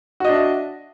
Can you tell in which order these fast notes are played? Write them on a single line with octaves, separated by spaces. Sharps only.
F#4 D#5 D4 E5